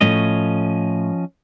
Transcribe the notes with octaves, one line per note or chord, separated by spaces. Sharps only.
A2 F3 A3 C#4 D#5